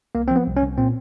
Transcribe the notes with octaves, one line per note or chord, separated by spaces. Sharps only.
C2 A#3
C4
F3
B3
C2
C#4
C2
A#2 C4